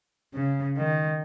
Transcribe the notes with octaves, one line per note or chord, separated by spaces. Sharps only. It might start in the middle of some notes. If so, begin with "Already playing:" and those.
C#3
D#3